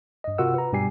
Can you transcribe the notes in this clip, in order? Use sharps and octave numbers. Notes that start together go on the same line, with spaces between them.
G2 D#5
C3 F4 F#4 A#4 F#5 E6
B4 A#5
G2 B2 G3 G4 G#5 C7